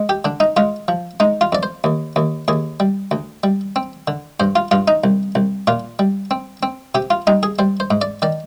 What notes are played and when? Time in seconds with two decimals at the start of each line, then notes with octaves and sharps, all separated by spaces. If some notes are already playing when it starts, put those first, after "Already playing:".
Already playing: G#3
0.09 G4
0.25 D3 D4
0.40 D#4
0.57 G#3 F4
0.88 F3
1.20 G#3 D#4
1.41 F4
1.52 F2 D5
1.63 C5
1.84 D#2
2.16 D#2
2.48 D#2 G#4
2.80 G3
3.11 D2
3.44 G3
3.76 C4
4.08 D3
4.40 G2 C5
4.56 F4
4.71 G2 F4
4.88 D#4
5.04 C2
5.35 C2
5.67 A#2 F4
5.99 G3
6.31 C4
6.63 C4
6.95 C3 G4
7.10 F4
7.27 G3 D#4
7.43 G#4
7.59 G3 C5
7.80 C5
7.91 G#2
8.02 D5
8.22 D#3 D5